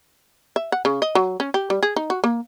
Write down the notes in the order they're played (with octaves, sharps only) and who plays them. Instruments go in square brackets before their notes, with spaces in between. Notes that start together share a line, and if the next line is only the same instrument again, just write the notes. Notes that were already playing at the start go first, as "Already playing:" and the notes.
[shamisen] E5
F#5
C#3
D#5
F#3
C#4
G4
G3
G#4
D#4
F#4
A#3